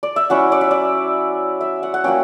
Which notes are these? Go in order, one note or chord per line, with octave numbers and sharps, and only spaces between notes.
D5
E5
F#3 C#4 E4 F#5
D5
E5
D5
E5
F#5
F#5
F#3 A#3 C#4 G5